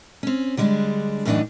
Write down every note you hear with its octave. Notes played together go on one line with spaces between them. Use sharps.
C4 C#4
D3 G3 G#3 B3 D4
F#2 A2 E3 D4 D#4